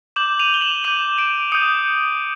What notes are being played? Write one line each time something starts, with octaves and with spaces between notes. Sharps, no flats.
D6 G6 E7 F#7
D#7 F7
G7
E7 F#7
D6 G6 D#7 F7
D7 E7
D#6 G6 C#7 D#7